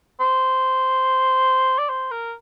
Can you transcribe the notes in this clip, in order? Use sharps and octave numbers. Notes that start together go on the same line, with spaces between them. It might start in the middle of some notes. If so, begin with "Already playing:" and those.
C5
D5
C5
A#4